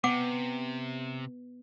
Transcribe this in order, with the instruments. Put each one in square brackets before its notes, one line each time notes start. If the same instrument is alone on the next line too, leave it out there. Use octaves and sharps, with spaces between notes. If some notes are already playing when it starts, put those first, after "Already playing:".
[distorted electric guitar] C3 [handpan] B3 [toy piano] F#5 D6